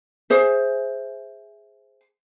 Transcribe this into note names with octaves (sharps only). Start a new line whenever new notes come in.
G#4 C5 E5